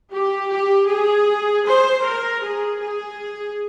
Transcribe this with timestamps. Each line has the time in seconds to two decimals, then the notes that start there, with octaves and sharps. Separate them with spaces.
0.12 G4
0.50 G4
0.88 G#4
1.67 C5
2.04 A#4
2.43 G#4
2.81 G#4